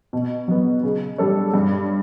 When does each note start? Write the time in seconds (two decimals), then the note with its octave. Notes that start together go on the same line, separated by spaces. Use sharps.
0.13 B2
0.48 F#3 B3
0.83 C#3
1.18 G3 D4 A4 C#5
1.54 G2